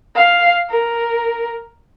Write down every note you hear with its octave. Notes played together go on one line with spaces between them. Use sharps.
F5
A#4